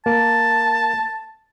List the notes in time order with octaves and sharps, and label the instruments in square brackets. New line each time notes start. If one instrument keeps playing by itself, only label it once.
[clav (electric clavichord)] A#3 [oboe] A5